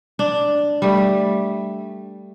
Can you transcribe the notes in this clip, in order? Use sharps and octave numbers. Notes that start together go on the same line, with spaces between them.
D4
G3 A3